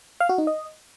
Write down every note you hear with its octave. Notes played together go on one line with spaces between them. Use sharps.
F5
F#4
D#4
D#5